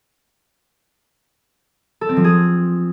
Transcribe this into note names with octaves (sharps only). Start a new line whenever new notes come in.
A4
C4
F3
G#4